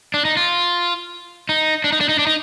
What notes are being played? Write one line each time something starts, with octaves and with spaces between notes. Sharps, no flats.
D4
D#4
F4
D#4
D4
D#4
D4
D#4
D4
D#4